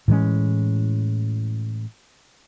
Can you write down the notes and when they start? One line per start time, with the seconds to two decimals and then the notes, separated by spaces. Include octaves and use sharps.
0.08 A2 E3 G#3 C#4